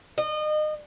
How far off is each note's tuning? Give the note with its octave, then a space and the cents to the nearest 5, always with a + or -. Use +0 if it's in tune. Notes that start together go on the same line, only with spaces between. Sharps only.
D#5 -30